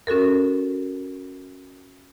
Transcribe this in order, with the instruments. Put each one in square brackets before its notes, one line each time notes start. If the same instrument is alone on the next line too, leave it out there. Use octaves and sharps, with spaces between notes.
[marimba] C#4 F#4 A4 A#4